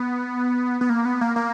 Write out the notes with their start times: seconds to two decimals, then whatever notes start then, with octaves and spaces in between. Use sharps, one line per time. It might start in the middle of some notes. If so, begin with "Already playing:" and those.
Already playing: B3
0.81 B3
0.89 A#3
1.05 B3
1.21 A#3
1.36 A#3